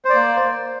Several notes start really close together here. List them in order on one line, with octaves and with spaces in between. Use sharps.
C5 D5 A#3